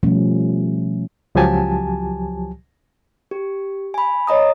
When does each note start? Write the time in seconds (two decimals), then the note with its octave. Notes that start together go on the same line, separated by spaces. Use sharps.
0.03 B2 F3 G3 A3 C#4
1.35 C#2 F3 F#3 G4 G#5 A5
3.31 G4
3.94 G#5 B5
4.27 C#5 D#5 A#5 D#6